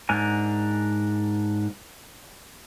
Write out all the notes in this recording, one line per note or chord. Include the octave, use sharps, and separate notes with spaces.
G#2 D4 A#4 G#5